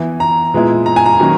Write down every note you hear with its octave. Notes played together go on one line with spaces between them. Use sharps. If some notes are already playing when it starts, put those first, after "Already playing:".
Already playing: E3 B3 E4
A#5
A#2 G#3 B3 E4
A#5
G#5
A#5
D#3 F#3 A#3 C#4